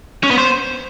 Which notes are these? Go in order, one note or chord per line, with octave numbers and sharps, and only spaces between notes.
C#4
B3
C5